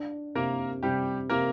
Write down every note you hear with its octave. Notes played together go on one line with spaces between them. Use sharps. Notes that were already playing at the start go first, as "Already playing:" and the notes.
Already playing: D4
C3 A#3 A#4
C3 G3 G4
C3 A#3 A#4